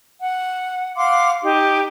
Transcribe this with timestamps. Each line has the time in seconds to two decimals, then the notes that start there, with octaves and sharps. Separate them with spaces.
0.22 F#5
0.97 F5 F#5 C6 D6
1.44 D#4 G4